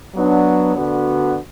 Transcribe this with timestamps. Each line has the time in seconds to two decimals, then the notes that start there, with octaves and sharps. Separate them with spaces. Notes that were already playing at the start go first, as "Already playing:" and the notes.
0.15 F#3 B3 D4
0.76 D2 D3 B3 D4 F#4